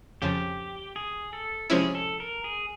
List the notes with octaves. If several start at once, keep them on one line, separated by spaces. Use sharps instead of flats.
F2 C#3 F3 G4
G#4
A4
C3 F3 G#3 C#4 E4 G#4
A4
A#4
G#4